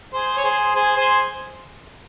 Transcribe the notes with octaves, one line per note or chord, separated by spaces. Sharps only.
G#4 C5
C#5
G#4 C5
G#4 C5
G#4 C5